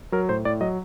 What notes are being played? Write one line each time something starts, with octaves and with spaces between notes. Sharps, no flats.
F#3 A#4
A2 C5
A2 D5
F#3 D#5